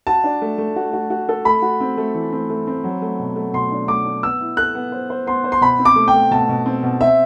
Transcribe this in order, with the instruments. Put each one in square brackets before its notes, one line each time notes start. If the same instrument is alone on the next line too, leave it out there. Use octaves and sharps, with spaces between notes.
[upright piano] F#4 [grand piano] A5
[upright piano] D4
A3
A3
F#4
F#4
F#4
A4
[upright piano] A3 [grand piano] B5
[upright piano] F#4
C4
A3
E3
C4
A3
C4
F#3
A3
B2
A3
[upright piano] B2 [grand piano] C6
[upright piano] D4
[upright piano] A3 [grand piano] D6
[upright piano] D4
[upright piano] B3 [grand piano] E6
[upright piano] E4
[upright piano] A4 [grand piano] F#6
[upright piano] B3
C5
C5
[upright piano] B3 [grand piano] C6
[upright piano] C5
[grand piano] C6
[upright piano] B2 [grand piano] B5
[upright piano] C4
[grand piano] D6
[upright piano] A3
[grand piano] G5
[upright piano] A3
[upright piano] B2 [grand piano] A5
[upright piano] B2
C4
B2
[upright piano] C4 [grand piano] E5